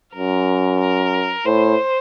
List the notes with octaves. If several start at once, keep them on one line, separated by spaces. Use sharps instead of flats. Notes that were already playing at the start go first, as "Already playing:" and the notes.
F#2 A#4
A#4
A2 C5